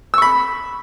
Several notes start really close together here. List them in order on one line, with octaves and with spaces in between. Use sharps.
E6 C#6 B5